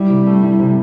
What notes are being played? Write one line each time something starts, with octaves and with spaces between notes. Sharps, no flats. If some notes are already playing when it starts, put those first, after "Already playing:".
Already playing: G3 E4
C3
A3
E4
C3